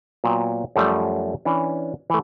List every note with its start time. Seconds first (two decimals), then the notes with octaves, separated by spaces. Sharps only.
0.24 A#2 F#3 B3 G5
0.76 F#2 F3 G3 A3 D5
1.45 E3 C#4 D4
2.10 E3 A3